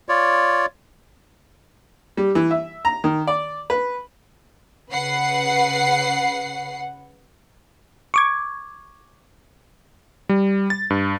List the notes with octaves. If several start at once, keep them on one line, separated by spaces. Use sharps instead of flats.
F4 C#5 D5
G3
E3
E5
A#5
D#3
D5
B4
C#3 B4 F#5 C7
C#6 D6 G#6
G3
A6
G2